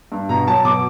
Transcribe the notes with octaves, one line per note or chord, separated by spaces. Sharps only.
G2
B2 A#5
F#3 A5
B2 D6